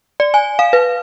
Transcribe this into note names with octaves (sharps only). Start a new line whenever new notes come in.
D5
G#5
F5
B4